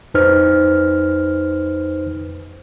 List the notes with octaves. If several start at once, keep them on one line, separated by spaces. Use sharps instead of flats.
F2 D#4 B4 C5 F6